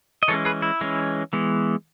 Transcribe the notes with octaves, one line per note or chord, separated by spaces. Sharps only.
D#5
E3 G#3 C#4 A4 C#5
G#4 B4
E4
E3 G#3 C#4
E3 G#3 B3